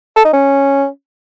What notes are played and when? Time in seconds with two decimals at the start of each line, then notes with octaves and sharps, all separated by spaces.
0.16 A4
0.25 D#4
0.33 C#4